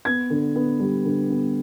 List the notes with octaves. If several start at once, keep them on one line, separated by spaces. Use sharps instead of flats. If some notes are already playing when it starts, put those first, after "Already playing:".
B3 G#6
D3
B3
G3
D3
B3